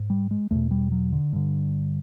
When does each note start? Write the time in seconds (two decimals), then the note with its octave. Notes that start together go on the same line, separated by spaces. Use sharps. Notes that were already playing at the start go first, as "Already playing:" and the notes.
Already playing: G#2
0.10 G3
0.31 G#3
0.51 E2 B2 A3
0.71 G3
0.92 F#3
1.12 D3
1.33 G2 D3